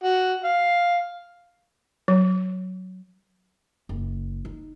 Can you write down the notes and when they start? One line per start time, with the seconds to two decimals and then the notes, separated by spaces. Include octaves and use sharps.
0.04 F#4
0.44 F5
2.08 F#3
3.89 F#1
4.45 D#4